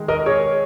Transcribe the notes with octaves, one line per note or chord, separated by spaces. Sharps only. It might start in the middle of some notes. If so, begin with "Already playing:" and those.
Already playing: D#3 G#3 D#4
A#4 D#5
G#4 C#5